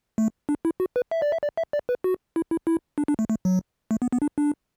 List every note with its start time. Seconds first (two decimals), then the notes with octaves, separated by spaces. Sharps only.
0.18 A3
0.49 D4
0.65 E4
0.80 F#4
0.96 B4
1.11 E5
1.22 D5
1.32 E5
1.43 D5
1.57 E5
1.73 D5
1.89 B4
2.04 F#4
2.36 E4
2.51 E4
2.67 E4
2.98 D4
3.08 D4
3.19 A3
3.30 A3
3.45 F#3
3.91 A3
4.02 B3
4.13 B3
4.22 D4
4.38 D4